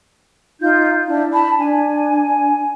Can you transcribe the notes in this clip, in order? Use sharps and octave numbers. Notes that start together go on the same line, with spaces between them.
D#4 F4 G6
D4 E4
A5 B5
D4 G#5